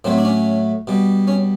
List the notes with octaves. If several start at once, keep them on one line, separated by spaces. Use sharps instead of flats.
A2 F#3 A3 C4
D4
C#4
B2 G3
C#4